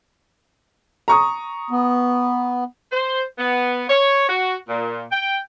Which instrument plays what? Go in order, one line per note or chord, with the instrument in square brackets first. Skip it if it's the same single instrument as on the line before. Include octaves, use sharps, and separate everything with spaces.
[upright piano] A#5 C#6 D#6
[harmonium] B3
[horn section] C5
B3
C#5
F#4
A#2
G5